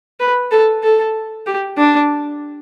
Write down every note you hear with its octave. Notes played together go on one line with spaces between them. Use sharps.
B4
A4
A4
G4
D4